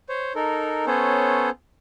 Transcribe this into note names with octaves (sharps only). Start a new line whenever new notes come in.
C5 C#5
D#4 A4 A#4
B3 C#4 A4 C5 C#5